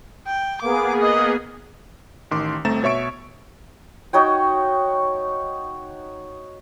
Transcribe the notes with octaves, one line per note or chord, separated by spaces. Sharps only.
G5
A#3 B3 G#4 D6
D#5
A1 D#3 C6 D6
G1 A3 C4 A#5 A6 E7
B2 C#5 E5 C#6 D7
D#4 F#4 C#5 G5